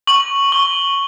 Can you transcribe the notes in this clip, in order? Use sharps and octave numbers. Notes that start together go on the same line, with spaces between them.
C#6 F#7
C#6 G7